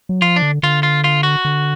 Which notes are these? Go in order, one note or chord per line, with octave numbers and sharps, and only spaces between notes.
F#3
F3 F4
D4
D3
D3 F4
F4
F4
F#4
D3